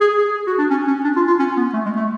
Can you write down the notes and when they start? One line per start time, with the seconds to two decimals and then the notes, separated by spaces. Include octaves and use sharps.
0.01 G#4
0.18 G#4
0.47 F#4
0.58 D4
0.70 C#4
0.87 C#4
1.04 D4
1.16 F4
1.27 F4
1.39 C#4
1.57 B3
1.74 A3
1.85 G#3
1.96 A3